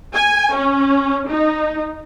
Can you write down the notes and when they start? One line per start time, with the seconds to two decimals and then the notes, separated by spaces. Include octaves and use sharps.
0.14 G#5
0.56 C#4
1.28 D#4